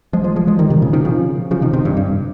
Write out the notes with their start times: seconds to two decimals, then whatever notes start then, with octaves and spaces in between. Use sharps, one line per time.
0.13 F3 G#3
0.24 F3 G#3
0.36 F3 G#3
0.47 F3 G#3
0.59 D#3 G3
0.70 C3 D#3
0.82 A#2 C#3
0.93 C3 D#3
1.05 C#3 F3
1.51 C#3 F3
1.62 C3 D#3
1.73 C3 D#3
1.85 G2
1.97 G2